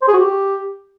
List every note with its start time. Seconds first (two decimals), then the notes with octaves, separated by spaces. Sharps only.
0.02 C5
0.08 G#4
0.13 F#4
0.19 G4